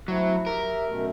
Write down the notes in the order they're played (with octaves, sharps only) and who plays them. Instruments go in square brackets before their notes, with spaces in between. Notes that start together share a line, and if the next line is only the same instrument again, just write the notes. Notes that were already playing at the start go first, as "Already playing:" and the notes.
[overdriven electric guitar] F#3 [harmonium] A3 C4 E4
[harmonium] G4 E5 [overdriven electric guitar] A#4
[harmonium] F#2 B2 A3